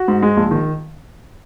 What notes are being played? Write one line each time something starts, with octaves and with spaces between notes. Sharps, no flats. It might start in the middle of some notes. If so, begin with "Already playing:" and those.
Already playing: F#4
G#2
G#3
A#1
D#3